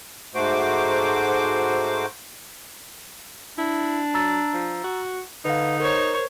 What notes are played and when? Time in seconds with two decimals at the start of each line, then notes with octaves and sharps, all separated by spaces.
0.35 G#2 A3 F#4 C5 D6
3.58 D4 E4
4.14 F#3 A#5 E6 A6
4.54 F3
4.84 F#4
5.45 D3 D#4 B4 F5
5.80 A#4 C5 C#5